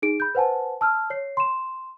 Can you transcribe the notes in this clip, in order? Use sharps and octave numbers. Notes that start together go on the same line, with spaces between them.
D#4 G#4 D7
B5 G6
B4 C5 F#5 G#5 A5
A5 E6 F6
C#5 C7
C6 E7